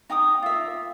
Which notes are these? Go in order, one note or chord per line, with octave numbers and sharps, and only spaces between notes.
D#4 G5 D6 D#6
F4 E5